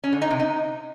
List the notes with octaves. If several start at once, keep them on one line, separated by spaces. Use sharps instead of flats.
C#4
D3
D#4
C3
D#4